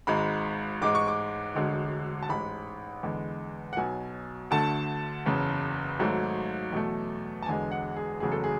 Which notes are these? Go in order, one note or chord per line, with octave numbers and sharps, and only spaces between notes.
G#1 G#2 G#3 B5
A1 G#2 G#3 D6
C#6
D6
E1 D2 D3 G#3
A5
A1 G#2 G#3 B5
E2 D3 G#3
F#5
B1 B2 F#3 G#5
D2 D3 A3 A5
F#1 E2 C#3
G#1 G#2 F#3 A3
E2 B2 F#3 A3
A5
E1 E2 D3 G#3 G#5
F#5
G#4
F#1 E2 C#3 F#3 A3 G#4
A4
G#4